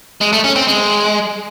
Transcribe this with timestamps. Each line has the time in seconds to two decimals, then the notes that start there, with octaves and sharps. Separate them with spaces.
0.21 G#3
0.33 A3
0.44 C#4
0.56 C4
0.67 G#3